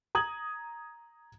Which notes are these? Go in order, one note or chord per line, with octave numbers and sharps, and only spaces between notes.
A#5 D#6 G#6 F#7